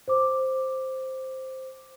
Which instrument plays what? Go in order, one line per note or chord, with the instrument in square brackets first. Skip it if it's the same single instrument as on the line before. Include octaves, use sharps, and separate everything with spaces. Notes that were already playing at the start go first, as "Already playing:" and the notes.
[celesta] C5 D6